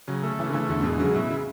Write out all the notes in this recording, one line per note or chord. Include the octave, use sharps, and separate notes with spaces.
C#3 F#3
A3
C#3 E3
D3
E3 A3
E2 D3
C#3
B2 G#3
D3
C#3 F#3
B2 E4
C#3